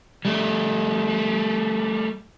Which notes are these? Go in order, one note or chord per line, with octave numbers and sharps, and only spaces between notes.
G3 A3